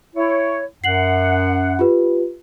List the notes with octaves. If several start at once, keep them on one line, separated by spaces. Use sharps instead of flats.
E4 C#5
F#2 F#5 C7 F#7
F4 G4 B4